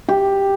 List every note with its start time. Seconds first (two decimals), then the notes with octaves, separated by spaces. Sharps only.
0.09 G4